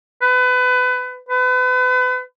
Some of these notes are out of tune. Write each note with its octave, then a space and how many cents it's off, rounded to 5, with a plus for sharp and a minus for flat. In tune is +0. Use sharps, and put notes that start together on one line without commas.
B4 +25
B4 +35